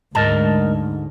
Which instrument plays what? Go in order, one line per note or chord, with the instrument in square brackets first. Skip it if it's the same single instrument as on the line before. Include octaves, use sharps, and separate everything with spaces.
[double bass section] D2 [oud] G#2 [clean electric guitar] A#4 D#5 A5